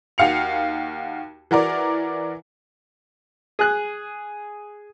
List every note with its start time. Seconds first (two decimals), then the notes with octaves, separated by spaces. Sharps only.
0.18 D#2 F#4 F5 C#7 F7
1.51 E3 F#4 A#4 D5
3.59 G#4 F#6